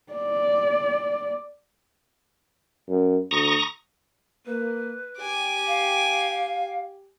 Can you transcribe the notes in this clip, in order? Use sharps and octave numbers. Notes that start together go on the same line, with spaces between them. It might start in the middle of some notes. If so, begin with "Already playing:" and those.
D5
F#2
D2 A#5 C#6 D#6
A#3 B4
G4 G#5 D6
F5